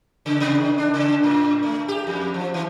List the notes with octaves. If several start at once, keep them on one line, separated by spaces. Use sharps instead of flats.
C#3
C3
D#3
D4
C#3
A2
A3
G4
F2
F3
E3